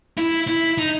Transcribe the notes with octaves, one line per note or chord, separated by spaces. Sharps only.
E4
E4
D#4